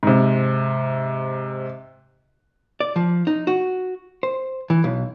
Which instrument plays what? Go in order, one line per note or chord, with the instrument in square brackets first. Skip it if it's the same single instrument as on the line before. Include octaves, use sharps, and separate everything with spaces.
[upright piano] G#2 C3
[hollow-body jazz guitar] D5
F3
D#4
F#4
C5
E3
B1